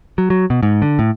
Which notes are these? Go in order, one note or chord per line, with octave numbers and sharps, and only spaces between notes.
F#3
F#3
B2
G#2
D3
A2